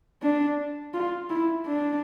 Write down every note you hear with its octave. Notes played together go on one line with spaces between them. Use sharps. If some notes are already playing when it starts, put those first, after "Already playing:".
D4
F4
E4
D4